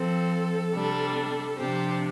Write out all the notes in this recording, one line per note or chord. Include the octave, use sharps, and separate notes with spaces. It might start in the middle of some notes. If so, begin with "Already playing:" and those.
Already playing: F3 C4 A4
C3 G3 D4
C3 F3 D4 G4 C5